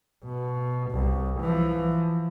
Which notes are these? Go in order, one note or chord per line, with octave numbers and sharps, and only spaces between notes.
B2
C2
E3 F3